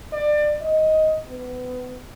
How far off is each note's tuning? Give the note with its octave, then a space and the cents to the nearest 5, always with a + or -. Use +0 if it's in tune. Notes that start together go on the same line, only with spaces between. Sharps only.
D5 +25
D#5 +10
B3 +25